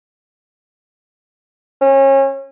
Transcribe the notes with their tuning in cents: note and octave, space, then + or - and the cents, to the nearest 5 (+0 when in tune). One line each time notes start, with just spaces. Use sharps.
C#4 -30